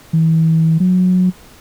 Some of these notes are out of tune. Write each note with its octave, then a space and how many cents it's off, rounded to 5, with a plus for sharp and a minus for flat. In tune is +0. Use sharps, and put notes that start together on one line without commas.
E3 -35
F#3 -20